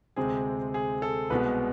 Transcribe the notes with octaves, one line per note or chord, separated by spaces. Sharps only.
D2 C3 G#3 C4 G#4
G#4
A4
C2 B2 G#3 B3 B4